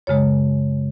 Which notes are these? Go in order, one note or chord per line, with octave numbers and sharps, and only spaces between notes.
F#2 C#3 G#3 C#5